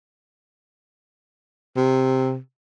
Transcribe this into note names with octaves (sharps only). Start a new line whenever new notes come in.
C3